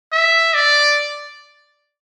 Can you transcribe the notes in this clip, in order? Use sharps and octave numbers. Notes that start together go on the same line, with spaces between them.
E5
D5